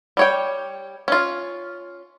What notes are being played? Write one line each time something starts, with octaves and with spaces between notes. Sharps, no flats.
G3 C#5 G5
C#4 F4